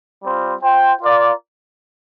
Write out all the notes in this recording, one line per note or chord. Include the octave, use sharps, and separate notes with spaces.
G3 C4 F4
F4 C5 G5
F4 A#4 D5 F5